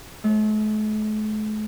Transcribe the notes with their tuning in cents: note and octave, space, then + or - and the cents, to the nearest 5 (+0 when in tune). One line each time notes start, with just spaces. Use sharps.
A3 -45